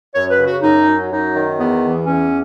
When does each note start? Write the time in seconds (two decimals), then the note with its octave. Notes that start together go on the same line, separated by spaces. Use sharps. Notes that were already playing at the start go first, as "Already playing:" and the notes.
0.14 F#2 C#5
0.31 B4
0.39 C#3
0.46 F#4
0.62 F#2 D#4
0.87 F#3
1.10 F#2 D#4
1.34 D#3
1.59 E2 B3
1.83 E3
2.07 E2 C#4